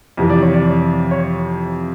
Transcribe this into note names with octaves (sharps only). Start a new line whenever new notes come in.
F2 C3 E3
D5
C#5
D5
C#5